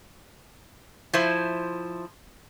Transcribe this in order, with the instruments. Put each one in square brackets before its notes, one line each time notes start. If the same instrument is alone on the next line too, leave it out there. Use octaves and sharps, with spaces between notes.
[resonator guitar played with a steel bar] F3 E4 C5